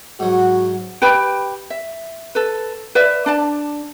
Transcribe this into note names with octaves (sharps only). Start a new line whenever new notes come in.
G#2 F#3 F#4
G4 B4 G5 B5
E5
A4 B4
B4 D5 E5
D4 D5 A5